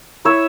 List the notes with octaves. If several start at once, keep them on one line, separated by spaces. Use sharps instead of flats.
E4 C#5 E5